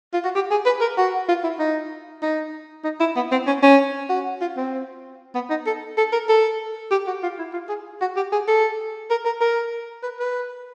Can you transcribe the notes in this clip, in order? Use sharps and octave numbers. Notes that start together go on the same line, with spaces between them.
F4
F#4
G4
G#4
B4
A#4
F#4
F4
E4
D#4
D#4
D#4
E4
B3
C4
C#4
C#4
F#4
F4
C4
B3
D#4
A4
A4
A#4
A4
G4
F#4
F4
E4
F4
G#4
F#4
G4
G#4
A4
A#4
A#4
A#4
B4
B4